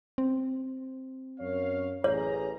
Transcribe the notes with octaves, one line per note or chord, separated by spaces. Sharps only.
C4
F#2 C#5 F5
A1 G#4 C#5 A#5